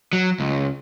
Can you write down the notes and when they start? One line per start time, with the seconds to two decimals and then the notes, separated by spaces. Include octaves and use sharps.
0.13 F#3
0.40 C#2